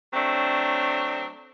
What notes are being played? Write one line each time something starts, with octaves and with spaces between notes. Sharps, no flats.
F#3 A3 C4 D4